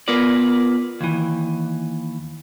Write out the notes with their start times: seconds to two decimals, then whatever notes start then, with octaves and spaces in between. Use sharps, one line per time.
0.08 B3 F4 A#4 B4 D5
1.01 D#2 E3